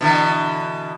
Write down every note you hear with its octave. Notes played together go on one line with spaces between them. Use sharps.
B2 D3 E3